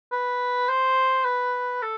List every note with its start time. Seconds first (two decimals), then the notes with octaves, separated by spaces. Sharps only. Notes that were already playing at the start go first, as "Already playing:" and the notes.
0.12 B4
0.69 C5
1.25 B4
1.82 A4